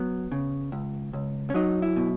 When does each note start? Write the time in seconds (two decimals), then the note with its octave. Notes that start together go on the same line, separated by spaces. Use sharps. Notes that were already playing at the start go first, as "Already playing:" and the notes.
Already playing: F#3 B3
0.32 C#3
0.72 C#2
1.13 C#2
1.50 C#4
1.54 F#3 D#4
1.82 E4
1.96 B2